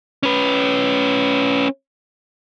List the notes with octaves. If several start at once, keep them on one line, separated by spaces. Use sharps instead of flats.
C#4 B4